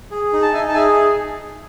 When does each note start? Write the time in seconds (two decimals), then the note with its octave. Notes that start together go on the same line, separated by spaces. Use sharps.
0.11 G#4
0.33 D#4
0.42 A5
0.53 D#4 E5 G#5
0.69 A5
0.74 G#4 E5 G#5